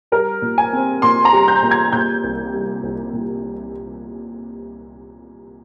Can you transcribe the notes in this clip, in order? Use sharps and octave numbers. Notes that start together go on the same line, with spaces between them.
G3 A#4
A#2
G#5
C4
A#2 C6
A#5
G3
G6
A#2
G#6
A#2 G6
C2
G3
C2
A#2